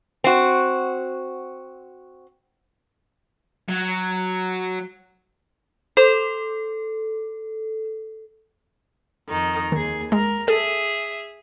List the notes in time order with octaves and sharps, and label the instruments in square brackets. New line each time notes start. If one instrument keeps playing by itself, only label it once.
[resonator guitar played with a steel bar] C4 F#4
[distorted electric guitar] F#3
[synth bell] A4 [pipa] C5
[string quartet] F2 D#3 D#4
[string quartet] D#2 G#4 [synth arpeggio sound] D#3
[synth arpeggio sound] G#3 [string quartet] A#4
[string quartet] G#4 E5 [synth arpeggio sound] A4